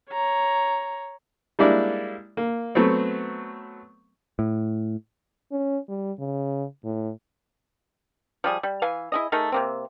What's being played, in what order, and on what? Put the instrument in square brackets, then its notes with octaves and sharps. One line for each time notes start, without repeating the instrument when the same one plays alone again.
[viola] C#5 A#5
[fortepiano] G3 G#3 A#3 D4 E4 D5
A#3
F#3 A3 B3 C4
[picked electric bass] A2
[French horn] C#4
G3
C#3
A2
[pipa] F3 G3 G#4
G3
E3 F5 G#5
E4 G#4 D#5
A3 D#4 G#4 A#4
C3 A#3 C4